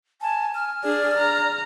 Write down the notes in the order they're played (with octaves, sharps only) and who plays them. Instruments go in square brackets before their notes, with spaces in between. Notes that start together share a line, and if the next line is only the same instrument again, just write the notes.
[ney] G#5 [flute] A5
[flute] F6
[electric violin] D4 G#4 [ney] D5
[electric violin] A#5